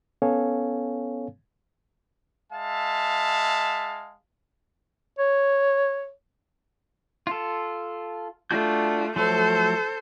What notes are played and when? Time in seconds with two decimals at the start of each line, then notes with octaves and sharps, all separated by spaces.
0.22 B3 C#4 A4 C#5 F5 G#5
2.52 G#3 E5 F5 A5
5.19 C#5
7.27 F4 A4
8.51 A3 D4 F4 F#4 G6
9.16 F3 F#3 A3 A4 C5